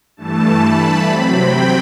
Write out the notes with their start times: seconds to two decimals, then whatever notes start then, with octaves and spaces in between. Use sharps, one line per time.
0.17 G2 E3 A3 A5
0.61 B5
1.06 C3 F#3 C4 B5
1.35 G5